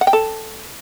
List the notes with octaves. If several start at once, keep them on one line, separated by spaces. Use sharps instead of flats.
F#5
G5
A4